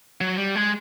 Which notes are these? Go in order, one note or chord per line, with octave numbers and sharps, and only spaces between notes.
F#3
G3
G#3